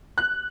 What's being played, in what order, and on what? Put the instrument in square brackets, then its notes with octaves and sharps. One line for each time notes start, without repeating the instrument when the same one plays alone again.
[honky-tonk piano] F#6